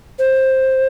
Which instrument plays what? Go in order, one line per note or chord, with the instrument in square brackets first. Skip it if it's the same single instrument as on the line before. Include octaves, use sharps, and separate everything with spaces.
[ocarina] C5